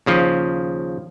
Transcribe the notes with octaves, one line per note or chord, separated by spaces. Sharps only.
D#2 C#3 F3